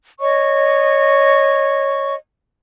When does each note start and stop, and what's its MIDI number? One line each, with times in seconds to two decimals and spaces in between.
0.20 2.14 73
0.20 2.14 75
0.20 2.14 85